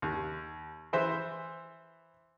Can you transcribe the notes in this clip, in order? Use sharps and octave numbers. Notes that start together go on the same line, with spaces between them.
D#2
E3 C5 E5